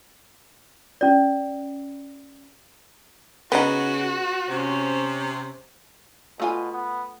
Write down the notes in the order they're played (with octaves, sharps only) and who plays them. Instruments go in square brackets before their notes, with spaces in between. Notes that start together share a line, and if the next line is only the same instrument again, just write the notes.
[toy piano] C#4 D5
[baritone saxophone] C#3 [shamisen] B3 D#4 [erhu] F#4
[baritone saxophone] C3 [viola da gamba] C#4 C5 C#5
[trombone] B2 [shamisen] A3 F4 G#5
[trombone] B3